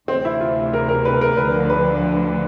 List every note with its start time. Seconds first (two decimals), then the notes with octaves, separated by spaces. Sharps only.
0.08 D2 C3 E3 C4
0.25 E4
0.40 F4
0.73 A#4
0.89 A#4
1.05 B4
1.21 A#4
1.37 D2 D3 F3 B4
1.70 B4